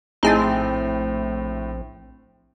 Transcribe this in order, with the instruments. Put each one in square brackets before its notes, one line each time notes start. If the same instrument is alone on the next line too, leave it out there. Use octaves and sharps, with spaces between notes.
[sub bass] A#1 [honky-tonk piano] A2 [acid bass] C4 [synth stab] D#4 G#4 A5